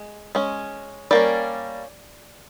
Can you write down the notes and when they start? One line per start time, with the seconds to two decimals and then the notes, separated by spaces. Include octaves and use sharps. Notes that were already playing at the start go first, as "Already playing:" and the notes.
Already playing: G#3
0.35 G#3 C#4
1.11 G3 A#3 C#4 D5